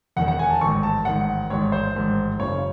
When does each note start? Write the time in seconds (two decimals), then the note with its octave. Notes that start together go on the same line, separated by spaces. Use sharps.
0.16 E1 E2 D#3 F#5
0.28 F#5
0.39 G#5
0.50 A5
0.61 A1 G#2 D#3 C#6
0.83 A5
1.05 A1 G#2 D#3 F#5
1.50 A1 G#2 D#3 C#5
1.72 C5
1.95 A1 G#2 D#3
2.39 F#1 F#2 C#3 C#5